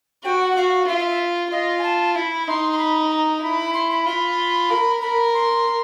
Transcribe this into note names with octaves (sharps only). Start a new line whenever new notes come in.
F#4 G5
F#5
F#4 F5
F4 E5
E5
E5
F4 D#5
G#5
A5
E4 B5
D#4 C6
C6
B5
A#5
E4 B5
C6
B5
F4 B5
A#4
A#4 B5
C6